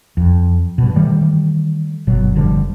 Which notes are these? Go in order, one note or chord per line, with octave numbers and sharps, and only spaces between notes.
F2
G2 B2
D#3 E3 G3 A3
G1 B2 F#3
F#1 D3 F3 G3